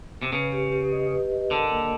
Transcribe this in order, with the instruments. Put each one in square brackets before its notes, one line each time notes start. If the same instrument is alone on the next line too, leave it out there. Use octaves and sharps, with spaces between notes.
[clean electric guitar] C3
[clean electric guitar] C#3 [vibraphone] B4
[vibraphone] G4
G4
D#5
B4
D#5
[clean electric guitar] D3 [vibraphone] A#4
[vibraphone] A#3